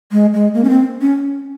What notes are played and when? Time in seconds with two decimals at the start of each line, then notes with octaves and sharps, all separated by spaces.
0.12 G#3
0.33 G#3
0.54 A#3
0.64 C#4
0.69 C4
1.01 C#4